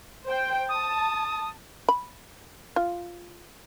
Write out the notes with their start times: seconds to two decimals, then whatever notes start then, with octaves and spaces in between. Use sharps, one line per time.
0.25 C5 G5
0.69 A5 D#6
1.89 B5
2.76 F4